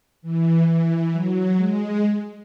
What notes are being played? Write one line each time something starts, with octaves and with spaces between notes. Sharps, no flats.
E3
E3
F#3
G#3